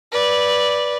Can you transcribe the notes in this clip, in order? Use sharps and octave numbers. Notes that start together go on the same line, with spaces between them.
B4 D5